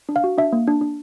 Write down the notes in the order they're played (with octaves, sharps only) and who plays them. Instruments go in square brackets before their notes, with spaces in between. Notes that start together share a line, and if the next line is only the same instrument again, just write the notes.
[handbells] D4
F5
F#4
D4 E5
A#3
D4
D4